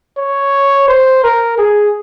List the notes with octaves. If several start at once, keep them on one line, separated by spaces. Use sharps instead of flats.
C#5
C5
A#4
G#4